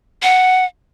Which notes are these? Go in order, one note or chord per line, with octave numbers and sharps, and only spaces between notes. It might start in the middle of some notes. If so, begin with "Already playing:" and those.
F#5